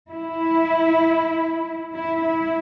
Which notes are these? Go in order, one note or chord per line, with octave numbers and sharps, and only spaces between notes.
E4
E4
E4